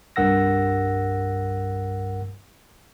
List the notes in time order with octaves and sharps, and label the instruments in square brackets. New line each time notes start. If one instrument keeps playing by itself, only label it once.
[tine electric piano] C2 G2 A#4 F#5 E6 A#6